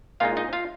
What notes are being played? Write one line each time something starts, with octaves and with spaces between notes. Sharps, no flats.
A#2 G#3 D#4 F4 F5
D#4 D#5
F4 F5